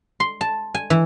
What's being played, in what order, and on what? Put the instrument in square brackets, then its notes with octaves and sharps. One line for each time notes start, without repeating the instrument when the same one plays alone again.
[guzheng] C6
A5
G#5
E3